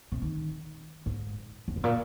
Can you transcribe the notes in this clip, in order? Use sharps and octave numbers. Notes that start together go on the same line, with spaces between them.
C3
D#3
G#2
F2
G#2
A#2